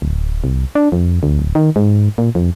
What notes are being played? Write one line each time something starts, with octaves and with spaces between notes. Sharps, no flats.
D1
C2
D4
F2
D2
D1
D#3
G#2
A#2
F2